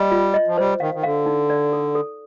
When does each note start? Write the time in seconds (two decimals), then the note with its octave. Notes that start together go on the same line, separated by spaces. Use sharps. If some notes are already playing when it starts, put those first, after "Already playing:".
Already playing: G3 D#5
0.12 F4
0.34 D#5
0.47 F3
0.58 G3 C5
0.80 D#3 F5
0.94 D#3
1.03 D3 F5
1.26 D#4
1.50 D5
1.73 A4
1.95 A4